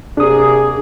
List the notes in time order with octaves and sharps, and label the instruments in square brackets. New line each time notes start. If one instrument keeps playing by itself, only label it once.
[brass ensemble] C3 A#3 G#4 [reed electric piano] D4 D#6